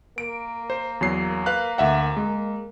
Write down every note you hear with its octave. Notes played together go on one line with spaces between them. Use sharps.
A#3 D7
C5
E2 F#3 C7
B4 F5 F#6
D2 E5 F#5
G#3